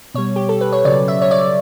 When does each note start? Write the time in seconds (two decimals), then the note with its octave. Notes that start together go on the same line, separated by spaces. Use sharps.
0.14 B2 G3 C#5
0.36 G4
0.49 A4
0.61 B4
0.72 C#5
0.85 C#3 F#3 D5
1.08 E5
1.21 C#5
1.31 D5